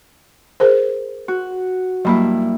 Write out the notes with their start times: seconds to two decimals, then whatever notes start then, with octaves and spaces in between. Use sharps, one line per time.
0.60 G#4 A#4 C5
1.28 F#4
2.05 G2 F#3 A#3 E4 B5